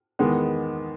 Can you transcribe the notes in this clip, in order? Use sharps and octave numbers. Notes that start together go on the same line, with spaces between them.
E2 D#3 G#3 B3